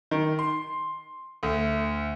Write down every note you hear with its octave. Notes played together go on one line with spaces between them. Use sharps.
D#3
C6
D2